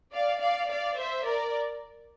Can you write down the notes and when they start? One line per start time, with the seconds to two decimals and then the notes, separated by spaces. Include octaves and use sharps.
0.13 D5 F5
0.41 D5 F5
0.70 D5 F5
0.98 C5 E5
1.25 A#4 D5